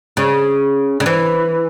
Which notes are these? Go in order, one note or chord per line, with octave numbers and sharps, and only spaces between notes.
C#3
C#3
E3